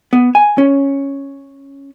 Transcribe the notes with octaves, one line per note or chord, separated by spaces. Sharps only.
B3
G#5
C#4